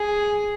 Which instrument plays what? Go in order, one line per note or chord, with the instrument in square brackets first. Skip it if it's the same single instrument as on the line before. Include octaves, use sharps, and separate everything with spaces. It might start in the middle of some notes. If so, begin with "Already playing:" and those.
Already playing: [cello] G#4